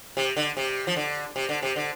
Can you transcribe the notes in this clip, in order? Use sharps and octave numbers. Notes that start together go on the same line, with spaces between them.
C3
D3
C3
F3
D3
C3
D3
C3
D3